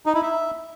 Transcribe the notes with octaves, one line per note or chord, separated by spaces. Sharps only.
D#4
E4
E5